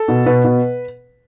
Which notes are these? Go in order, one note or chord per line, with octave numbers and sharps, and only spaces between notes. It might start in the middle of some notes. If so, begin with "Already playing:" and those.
Already playing: A4
B2
B2 B4
B2